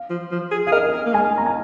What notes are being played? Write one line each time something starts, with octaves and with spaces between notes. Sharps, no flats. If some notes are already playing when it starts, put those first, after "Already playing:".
Already playing: F5
F3
F3
G#4
G#4 F5
A#4 D#5
A#4
A#3
G#3 G#5
A#5
G#5